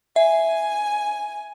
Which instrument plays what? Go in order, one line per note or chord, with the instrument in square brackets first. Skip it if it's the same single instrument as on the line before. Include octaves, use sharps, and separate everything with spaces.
[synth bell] E5 [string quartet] G#5